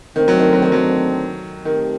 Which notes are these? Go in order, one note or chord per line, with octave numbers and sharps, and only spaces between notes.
D3 D#3 A3 C4 D#4
F#3
D#3
F#3
D#3
F#3
D#3 A3 C4 G4